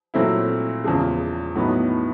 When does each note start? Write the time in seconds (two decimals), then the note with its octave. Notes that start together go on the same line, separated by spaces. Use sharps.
0.14 A#2 F#3 A3 C4 E4
0.84 E2 C#3 F3 G#3
1.56 A2 F#3 B3 D#4